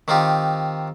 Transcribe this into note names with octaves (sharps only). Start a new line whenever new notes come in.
D#3 C4 D#4 F4 G4